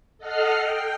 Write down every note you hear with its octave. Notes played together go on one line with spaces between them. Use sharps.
A4 D#5 F#5 F6 C7
G5